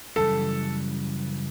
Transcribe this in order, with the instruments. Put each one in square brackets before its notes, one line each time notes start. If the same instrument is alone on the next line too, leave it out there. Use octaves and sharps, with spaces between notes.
[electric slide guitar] F#2 C#3 E3 G3 [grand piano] A4